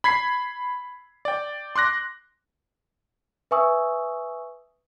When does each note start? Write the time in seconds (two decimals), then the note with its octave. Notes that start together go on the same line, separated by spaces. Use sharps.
0.04 B5 G#6 B6 C7
1.25 D5 G5
1.76 C6 D6 F#6 A#6
3.51 B4 E5 G#5 C#6 D#6 E6